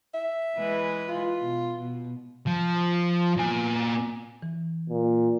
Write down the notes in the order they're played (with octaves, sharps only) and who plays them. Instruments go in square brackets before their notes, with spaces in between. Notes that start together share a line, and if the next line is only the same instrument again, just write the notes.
[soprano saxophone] E5
[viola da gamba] E3 G#3 B4
[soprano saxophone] F4
[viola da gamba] B2
B2
[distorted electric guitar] F3
A#2 G#5
[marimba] E3
[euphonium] A#2